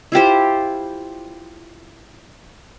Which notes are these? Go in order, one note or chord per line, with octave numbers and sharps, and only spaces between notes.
E4 F4 G4 C5